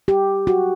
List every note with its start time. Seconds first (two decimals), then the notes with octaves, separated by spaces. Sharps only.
0.08 G4
0.47 F#4